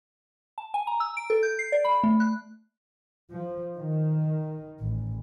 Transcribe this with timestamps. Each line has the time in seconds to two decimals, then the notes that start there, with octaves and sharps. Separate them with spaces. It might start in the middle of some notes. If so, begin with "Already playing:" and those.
0.58 A5
0.74 G#5
0.87 A#5
1.00 E6
1.17 D7
1.30 A4
1.43 G6
1.59 C7
1.72 D5
1.84 B5
2.04 A3
2.20 F#6
3.29 F3
3.76 D#3
4.80 A1